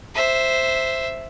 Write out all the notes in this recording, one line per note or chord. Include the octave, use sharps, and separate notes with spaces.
C5 E5